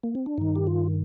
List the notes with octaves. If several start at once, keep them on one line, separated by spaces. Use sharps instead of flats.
A#3
C4
D4
G2 D#3 D#4
G4
F4